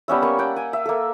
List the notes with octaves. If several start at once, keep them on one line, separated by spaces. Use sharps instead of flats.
G3 B3 C#4 E5
A#3 C#6
D5 F#5 G5
G#5
E5
A#3 A4